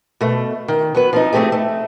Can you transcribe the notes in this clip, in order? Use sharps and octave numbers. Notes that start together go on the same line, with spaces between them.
B2 A3
D#3
F#3 B3 B4
F3 C4 D#4
A3 A#3 C4 G4 G#4
A3